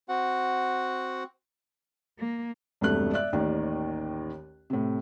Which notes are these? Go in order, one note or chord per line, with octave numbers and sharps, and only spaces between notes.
C4 F#4 F#5
A#3
E1 G2 C3 A3 F#6
D5 E5 F#6
A1 D#2 D#3 D5
A2 C3